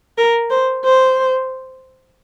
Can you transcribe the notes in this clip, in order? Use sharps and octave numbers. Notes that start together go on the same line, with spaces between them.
A#4
C5
C5